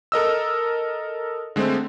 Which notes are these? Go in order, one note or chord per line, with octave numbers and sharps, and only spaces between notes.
A4 A#4 D#5 E6
D3 G#3 A3 C4